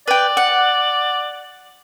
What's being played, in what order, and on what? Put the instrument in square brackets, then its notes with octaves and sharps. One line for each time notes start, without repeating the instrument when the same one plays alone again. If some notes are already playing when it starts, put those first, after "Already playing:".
[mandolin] B4 G5 [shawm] D5
[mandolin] F#5